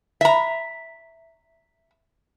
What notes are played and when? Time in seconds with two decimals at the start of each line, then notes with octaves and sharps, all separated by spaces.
0.21 E5 A#5